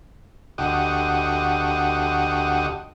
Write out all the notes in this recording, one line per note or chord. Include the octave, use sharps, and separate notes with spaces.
D2 F#4 G4 D#5